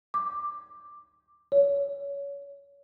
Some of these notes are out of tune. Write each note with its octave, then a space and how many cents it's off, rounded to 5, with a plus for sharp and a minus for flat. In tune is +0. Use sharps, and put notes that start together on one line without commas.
D6 +10
C#5 +25